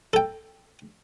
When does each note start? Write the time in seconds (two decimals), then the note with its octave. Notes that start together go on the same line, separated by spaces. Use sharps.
0.13 A4 G5